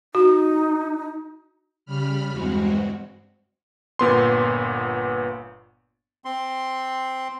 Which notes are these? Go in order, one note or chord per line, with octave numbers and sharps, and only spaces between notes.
D#4 F#4
C#3 G3 B5 F6
E2 G2 G#3 C4 F#4
G1 A#2 B3 C6
C4 C6